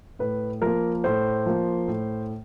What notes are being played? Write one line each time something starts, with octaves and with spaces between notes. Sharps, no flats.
A2 B4
F3 A#3 A#4
A2 C5
F3 A#3
A2